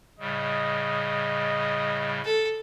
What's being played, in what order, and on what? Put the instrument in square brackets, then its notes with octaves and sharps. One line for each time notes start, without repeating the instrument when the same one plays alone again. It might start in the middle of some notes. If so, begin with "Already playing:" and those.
[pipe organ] A2 C#3 G3 [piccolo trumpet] D#5
[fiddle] A4